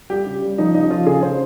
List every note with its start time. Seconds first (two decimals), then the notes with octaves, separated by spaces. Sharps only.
0.10 G3 G4
0.26 C#3
0.42 G3
0.58 F3 D#4
0.74 C#3 D#4
0.90 F3 F4
1.06 C#3 G#4
1.23 C#3 C5